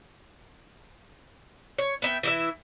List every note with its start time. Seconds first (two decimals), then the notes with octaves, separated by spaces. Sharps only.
1.79 C#5
2.02 B3 E5 G5
2.23 E3 E4 E5